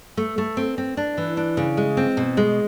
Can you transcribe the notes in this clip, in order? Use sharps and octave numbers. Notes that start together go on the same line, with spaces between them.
A3
A3
C4
C4
D4
E3
D4
C#3
G#3
C4
B2
G#3